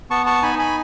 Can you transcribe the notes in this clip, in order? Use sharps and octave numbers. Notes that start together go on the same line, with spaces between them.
B3 A5 C#6
A5 C#6
D#4 G#5 B5
G#5 B5